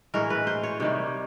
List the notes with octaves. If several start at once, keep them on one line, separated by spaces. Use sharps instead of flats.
A2 E3 G#3 A#4
B4
C5
C#5
C3 D#3 G3 C#5